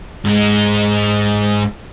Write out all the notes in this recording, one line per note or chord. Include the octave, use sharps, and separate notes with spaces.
G#2 G#3